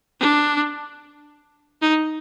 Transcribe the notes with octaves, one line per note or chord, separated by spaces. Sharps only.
D4
D#4